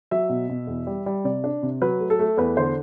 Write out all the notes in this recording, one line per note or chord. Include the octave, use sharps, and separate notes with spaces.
F#3 E5
B2
B2
E2
G3
G3
C3 D5
D4
C3
F#3 B4
A3
A4
A3
E2 B4
D3 C5